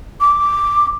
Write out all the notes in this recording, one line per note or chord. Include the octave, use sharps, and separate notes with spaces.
D6